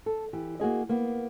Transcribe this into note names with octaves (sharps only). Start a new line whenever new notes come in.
A4
E3 G4
A#3 F#4 G#4 D#5
A#3 B3